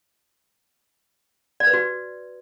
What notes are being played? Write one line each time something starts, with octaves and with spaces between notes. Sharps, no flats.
D5
B4
F#4